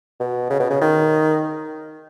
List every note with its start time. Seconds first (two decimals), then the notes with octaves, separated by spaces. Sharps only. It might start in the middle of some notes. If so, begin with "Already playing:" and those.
0.20 B2
0.50 C#3
0.60 B2
0.70 C#3
0.82 D#3